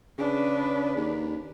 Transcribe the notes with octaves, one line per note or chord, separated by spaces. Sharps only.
C#3 D4 B4
D#2